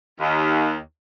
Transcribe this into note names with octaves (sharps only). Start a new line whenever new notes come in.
D#2